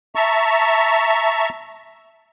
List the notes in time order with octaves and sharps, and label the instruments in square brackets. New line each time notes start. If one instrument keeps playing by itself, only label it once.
[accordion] E5 A5 A#5 C#6